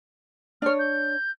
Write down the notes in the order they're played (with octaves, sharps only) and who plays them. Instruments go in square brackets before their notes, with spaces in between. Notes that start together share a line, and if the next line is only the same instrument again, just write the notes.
[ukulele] D4 C#5 [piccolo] F6
[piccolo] G6